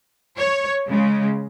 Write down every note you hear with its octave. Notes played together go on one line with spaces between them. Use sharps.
C#5
C#3 G#3